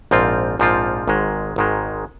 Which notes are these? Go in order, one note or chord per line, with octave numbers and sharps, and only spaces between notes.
A#1 G#2 F3 C4 F4
A#1 G#2 F3 C4 F4
G#1 G#2 D#3 G#3
G#1 G#2 D#3 G#3